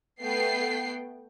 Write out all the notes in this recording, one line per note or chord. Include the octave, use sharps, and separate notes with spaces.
A3 B3 G5 C7